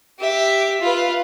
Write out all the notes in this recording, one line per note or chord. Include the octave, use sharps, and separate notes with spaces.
G4 E5
F4 B4